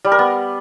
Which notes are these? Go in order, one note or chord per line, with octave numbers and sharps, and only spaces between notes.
G3
A#4
B3